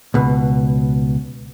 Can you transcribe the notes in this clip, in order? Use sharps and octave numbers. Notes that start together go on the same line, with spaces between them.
C#2 B2